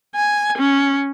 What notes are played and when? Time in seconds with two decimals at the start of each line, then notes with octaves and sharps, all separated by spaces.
0.15 G#5
0.58 C#4